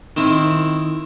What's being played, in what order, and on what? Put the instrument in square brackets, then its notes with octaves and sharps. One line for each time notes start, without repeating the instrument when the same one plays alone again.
[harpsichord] D#3 C4 E4